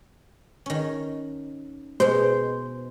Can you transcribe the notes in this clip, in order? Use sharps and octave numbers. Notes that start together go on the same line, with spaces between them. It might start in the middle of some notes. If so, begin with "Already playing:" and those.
D#3 C#4
B2 G#3 C5